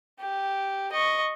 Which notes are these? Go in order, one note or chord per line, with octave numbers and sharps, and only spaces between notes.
G4
D#5 C#6